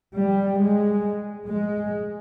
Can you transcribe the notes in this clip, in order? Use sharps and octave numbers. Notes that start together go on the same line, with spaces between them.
G3
G#3
G#3